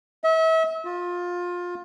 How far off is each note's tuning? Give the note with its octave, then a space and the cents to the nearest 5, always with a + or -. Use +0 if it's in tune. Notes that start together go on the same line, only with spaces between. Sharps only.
E5 -35
F4 +20